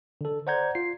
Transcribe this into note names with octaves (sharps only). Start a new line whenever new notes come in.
D3 A4
C5 D5 F#5 A#5 G6 G#6
F4 C7